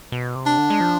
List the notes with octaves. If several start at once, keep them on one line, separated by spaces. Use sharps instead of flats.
B2
C3
D4
D3
G#3
F3